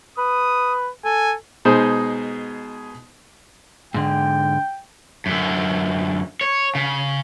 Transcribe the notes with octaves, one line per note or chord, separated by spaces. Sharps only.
B4 D#6
A4 G#5
B2 G#3 D#4 G#4 C5
G#2 D3 G5
F#2 D3
C#5
C#3